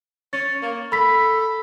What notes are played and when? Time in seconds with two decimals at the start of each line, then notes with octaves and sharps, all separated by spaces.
0.33 C#4 A6
0.62 A#3
0.92 A4 B5 B6